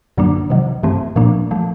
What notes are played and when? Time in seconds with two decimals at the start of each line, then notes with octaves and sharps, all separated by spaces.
0.17 F#2 D3 F#3 A#3 D4
0.50 C3 D#3 F#3
0.83 G2 E3 A3 C4
1.16 A#2 F3 A#3 D4
1.51 F3 A3